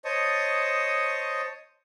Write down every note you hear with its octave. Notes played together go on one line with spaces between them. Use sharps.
C5 C#5 D#5 A5 C#6 D#6